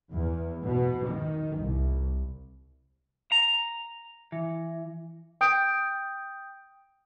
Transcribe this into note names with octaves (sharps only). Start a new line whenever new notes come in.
E2
B2
D#3
C2
A#5
E3
G5 D#6 G6 D7